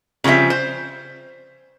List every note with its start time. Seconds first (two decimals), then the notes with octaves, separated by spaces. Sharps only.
0.24 C#3 F3 G3 C4 E5
0.50 C5